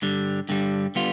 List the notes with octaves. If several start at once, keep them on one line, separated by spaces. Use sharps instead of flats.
G2 D3 G3
G2 D3 G3
D3 G3 B3 F4